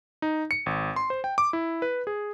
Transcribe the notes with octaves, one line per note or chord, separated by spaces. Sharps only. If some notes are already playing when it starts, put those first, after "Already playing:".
D#4
C#7
G#1
C6
C5
G5
D6
E4
B4
G#4